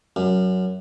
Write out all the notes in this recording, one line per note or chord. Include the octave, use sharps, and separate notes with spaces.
F#2